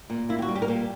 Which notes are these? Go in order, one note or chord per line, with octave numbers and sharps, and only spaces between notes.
A#2
A#3 E4
G4
F#4
G3
G4
A#4
A#2 G4